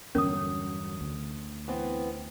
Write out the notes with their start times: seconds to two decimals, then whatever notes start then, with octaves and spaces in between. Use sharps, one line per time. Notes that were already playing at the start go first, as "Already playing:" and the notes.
0.15 E2 G2 D3 F#3 C#4 A#4 D#6
1.01 D2
1.68 E3 B3 C4